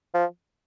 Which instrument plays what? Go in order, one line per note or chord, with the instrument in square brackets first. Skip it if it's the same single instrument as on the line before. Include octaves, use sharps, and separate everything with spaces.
[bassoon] F3